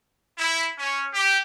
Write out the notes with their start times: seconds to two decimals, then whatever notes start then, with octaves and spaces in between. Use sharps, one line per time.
0.36 E4
0.77 C#4
1.12 G4